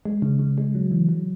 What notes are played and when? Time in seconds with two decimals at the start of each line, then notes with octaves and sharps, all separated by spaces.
0.05 G#3
0.22 C#3
0.39 C#3
0.58 G#3
0.75 F#3
0.91 E3
1.09 F#3